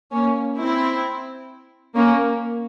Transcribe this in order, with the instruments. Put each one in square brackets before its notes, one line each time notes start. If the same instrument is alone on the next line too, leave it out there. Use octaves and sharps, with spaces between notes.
[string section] A#3 C#4
C4 E4
A#3 C#4